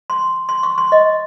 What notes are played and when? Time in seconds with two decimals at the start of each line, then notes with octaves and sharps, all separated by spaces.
0.10 C6
0.49 C6
0.63 C#6
0.78 C6
0.92 D#5